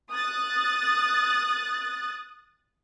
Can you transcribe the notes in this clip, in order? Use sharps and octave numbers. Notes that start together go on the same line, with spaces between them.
D#6 F#6 A6